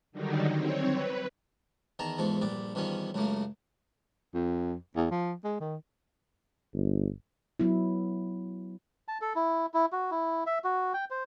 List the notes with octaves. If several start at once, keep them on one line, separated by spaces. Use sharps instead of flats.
D3 D#3 F#3 G3 D#4
C4 C#5
B4
E2 D#3 A5 A#5
E2 G#2 F3 A4
A#1 G2 D5
E2 G2 D#3 F3 C#4
C#2 F#2 C#3 A3 A#3
F2
E2
F3
G#3
D#3
G1
F#3 B3 E4
A5
A4
E4
E4
F#4
E4
E5
F#4
G5
C5